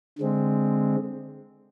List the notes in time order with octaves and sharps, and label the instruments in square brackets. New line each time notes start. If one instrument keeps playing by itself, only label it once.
[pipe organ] D3 G#3 C4